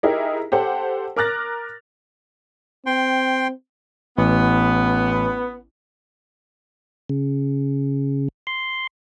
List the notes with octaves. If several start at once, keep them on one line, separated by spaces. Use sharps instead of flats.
D#4 E4 G4 G#4 A#4
G4 A4 C5 F#5
A#4 D6 F6 F#6 A6 A#6
C4 G5 C6
A1 B3
C#3
C6